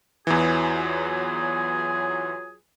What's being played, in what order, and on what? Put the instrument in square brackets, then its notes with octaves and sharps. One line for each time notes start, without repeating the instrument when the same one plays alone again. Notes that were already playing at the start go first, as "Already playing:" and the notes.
[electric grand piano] E2 E3 [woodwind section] F#3 F4 G#4